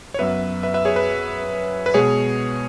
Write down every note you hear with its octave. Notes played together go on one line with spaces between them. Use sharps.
C#5
F#2 F#3 B3 B4 E5
B4 E5
B4 E5
G#4 C#5
B4
B4
B2 G#3 B3 G#4 C#5